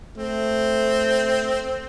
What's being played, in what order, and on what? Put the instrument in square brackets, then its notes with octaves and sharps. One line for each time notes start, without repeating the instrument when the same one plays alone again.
[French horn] A3 [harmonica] C4